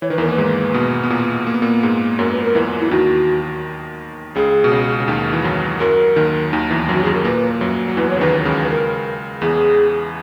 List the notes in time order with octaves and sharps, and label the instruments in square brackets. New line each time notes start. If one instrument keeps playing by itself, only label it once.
[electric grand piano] E3 [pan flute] C#5
[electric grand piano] D#3 [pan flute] B4
[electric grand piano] E2 E3 [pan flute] A#4
[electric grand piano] A#3 [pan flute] B4
[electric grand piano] G#2 G#3
B2 B3
B3
A#2 A#3
A#3
B3
A#2 A#3
G#2 G#3
[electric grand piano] F#2 F#3 [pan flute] A#4
[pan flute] B4
A#4
[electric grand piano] E2 E3
[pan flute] E4
[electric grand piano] D#2 D#3 [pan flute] F#4
[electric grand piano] C#2 C#3 [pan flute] G#4
[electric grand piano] B2
C#2 C#3
C#3
D#2 D#3
E3
F#2 F#3
[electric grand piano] F#2 F#3 [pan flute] A#4
[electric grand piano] D#2 D#3
D#2 D#3
E2 E3
[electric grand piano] F#2 F#3 [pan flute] F#4
[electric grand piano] F#2 F#3 [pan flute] G#4
[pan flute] A#4
[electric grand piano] A#2 A#3 [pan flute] B4
[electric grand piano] F#2 F#3
F#3
[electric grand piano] E2 E3 [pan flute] B4
[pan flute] C#5
[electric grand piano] C#3
[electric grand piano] D#2 D#3 [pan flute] B4
[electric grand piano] C#2 C#3
[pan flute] B4
A#4
[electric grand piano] E2 E3 [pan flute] G#4